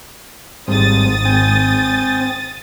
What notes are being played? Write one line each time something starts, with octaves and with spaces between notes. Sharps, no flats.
G#1 G#2 G3 C4 D#6 A6
C4 G5 G#5